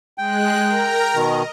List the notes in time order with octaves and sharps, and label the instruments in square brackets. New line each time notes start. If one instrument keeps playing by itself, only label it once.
[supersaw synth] G#3 F#6 [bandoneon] G5
[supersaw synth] A#4 A#5
[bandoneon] B2 D#3 [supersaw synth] D#5